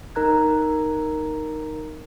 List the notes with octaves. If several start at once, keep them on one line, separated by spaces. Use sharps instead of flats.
D#4 A#4 A#5 F#6 G#6